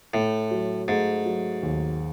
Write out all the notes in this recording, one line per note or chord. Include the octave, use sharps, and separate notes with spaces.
A2 A3
F#3
G#2 A3
F#3
D#2